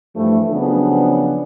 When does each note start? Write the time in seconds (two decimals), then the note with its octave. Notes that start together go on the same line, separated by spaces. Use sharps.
0.16 G2 E3 F3 A3
0.50 C#3 F3 F#3 B3 C4 D4